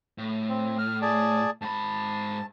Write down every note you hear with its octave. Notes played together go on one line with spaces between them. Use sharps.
A2
C4
F6
G#4 D5 A5
G#2 A5 B5